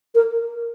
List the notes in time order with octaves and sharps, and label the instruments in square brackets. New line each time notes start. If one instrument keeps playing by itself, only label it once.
[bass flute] A#4